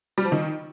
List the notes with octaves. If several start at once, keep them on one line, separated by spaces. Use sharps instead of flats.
G3
F3
D#3